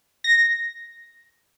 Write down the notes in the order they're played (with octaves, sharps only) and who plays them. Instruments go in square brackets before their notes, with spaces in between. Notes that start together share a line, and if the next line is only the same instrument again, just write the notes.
[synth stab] A#6